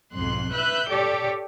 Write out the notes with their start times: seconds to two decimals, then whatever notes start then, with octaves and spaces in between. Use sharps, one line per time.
0.12 B1 F2 G#2 C6 F#6
0.52 B4 E5 E6 F#6 G6
0.89 G4 A4 C#5 D5